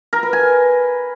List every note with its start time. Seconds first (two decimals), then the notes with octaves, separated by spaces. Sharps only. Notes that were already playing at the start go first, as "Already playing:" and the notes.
0.13 A#4
0.23 B4
0.33 G#5